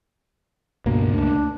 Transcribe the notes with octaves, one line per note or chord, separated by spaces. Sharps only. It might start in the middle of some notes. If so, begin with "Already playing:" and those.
C#2 G2 B2 A#3
D2 D4